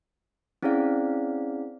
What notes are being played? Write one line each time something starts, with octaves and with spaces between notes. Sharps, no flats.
C4 C#4 E4 G#4 D5 F5